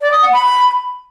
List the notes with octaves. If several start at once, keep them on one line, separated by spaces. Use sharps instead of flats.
D5
D#6
F#5
B5